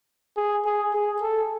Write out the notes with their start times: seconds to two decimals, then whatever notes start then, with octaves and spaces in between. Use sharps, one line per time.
0.37 G#4
0.65 G#4
0.94 G#4
1.22 A4